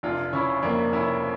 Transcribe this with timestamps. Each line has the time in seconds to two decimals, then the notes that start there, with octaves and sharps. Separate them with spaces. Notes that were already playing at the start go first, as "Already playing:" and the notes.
0.03 F1 D4 F4
0.33 C#3 C#4 E4
0.62 F2 A#3 D4
0.93 F1 C#4 E4